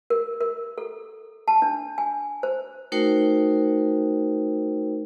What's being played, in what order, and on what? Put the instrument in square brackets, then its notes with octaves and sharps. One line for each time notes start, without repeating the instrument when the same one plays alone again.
[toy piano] A#4
A#4
A4
A5
D4
G#5
C5
[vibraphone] A3 D#4 F#4 A#4 C5 G5